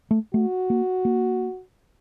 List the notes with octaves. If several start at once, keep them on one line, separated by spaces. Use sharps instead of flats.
A3
A3 F#4
A#3
A#3